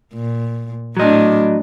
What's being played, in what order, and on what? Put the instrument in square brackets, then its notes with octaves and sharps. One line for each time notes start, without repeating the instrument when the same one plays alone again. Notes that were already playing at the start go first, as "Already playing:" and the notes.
[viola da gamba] A#2
[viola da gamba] A2 D4 [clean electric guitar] F#3 D#5